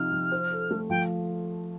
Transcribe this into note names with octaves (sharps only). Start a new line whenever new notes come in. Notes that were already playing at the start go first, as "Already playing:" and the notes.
Already playing: C3 F3 D#4 F6
F3
C5
A4
A3
F3 G5